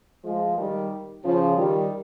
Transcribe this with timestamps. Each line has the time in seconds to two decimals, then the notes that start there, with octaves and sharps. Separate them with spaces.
0.23 F3 G#3
0.57 D#3 G3
1.23 C#3 F3
1.57 D#3 G3